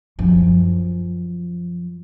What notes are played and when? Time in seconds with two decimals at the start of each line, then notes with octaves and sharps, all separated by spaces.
0.19 F#2 F3